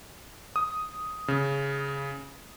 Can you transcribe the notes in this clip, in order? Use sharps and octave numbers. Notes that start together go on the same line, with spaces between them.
D#6
C#3